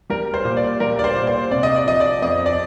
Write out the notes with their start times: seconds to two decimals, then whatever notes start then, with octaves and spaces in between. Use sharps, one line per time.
0.10 G3 A#4
0.34 C5
0.45 A#2
0.57 D5
0.80 G3 A#4
0.99 D5
1.04 C5
1.16 A#2
1.27 C5
1.51 C3 D5
1.63 D#5
1.76 D5
1.87 F3 D#5
2.00 D5
2.22 F2 D#5
2.46 D5